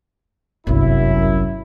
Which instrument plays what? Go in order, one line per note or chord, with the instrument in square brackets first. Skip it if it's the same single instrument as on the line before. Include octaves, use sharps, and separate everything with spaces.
[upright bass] G1 C2 [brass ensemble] F#2 E4